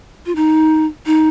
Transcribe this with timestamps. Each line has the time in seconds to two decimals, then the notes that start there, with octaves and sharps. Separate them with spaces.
0.26 F4
0.36 D#4
1.06 D#4